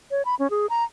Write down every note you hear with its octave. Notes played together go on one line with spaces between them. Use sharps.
C#5
B5
C#4
G#4
A#5